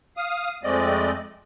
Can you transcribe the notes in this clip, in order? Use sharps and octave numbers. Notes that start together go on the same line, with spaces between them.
F5 D#6
F2 G#3 A3 C4 D5 D#5